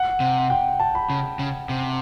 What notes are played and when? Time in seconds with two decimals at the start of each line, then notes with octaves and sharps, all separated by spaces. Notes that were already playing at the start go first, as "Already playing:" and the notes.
Already playing: F#5
0.20 C3
0.50 G5
0.80 A5
0.95 B5
1.10 C#3
1.39 C#3
1.69 C3